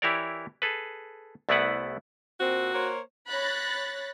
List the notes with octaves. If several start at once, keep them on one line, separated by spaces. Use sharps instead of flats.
E3 E4 G4 A#4 C#5 D5
G#4 A4 B4
C2 A3 B3 E4 B4 F#5
A#2 C4 F#4
A#3 C5 C#5
C#5 B5 F#6 A6 A#6